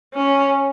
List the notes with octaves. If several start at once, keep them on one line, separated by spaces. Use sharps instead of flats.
C#4